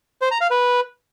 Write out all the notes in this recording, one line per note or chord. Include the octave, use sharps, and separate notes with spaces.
C5
A#5
F5
B4